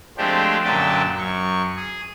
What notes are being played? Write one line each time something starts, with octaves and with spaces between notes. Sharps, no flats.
F3 G#3 A3 C4 D4 G4
F#2 A#2 D3 E5 G5 A5
F#2 C#6
G#4